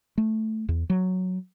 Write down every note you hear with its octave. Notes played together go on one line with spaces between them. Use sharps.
A3
E2
F#3